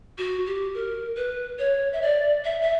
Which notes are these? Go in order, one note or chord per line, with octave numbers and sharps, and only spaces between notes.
F#4
G4
A#4
B4
C#5
E5
D5
E5
E5